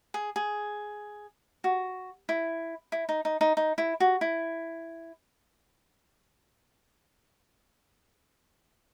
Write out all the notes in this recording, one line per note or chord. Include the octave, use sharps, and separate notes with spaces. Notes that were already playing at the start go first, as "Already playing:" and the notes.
G#4
G#4
F#4
E4
E4
D#4
D#4
D#4
D#4
E4
F#4
E4